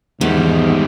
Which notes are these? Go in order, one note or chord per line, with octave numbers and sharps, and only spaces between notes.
E2 G#2 D#3 G3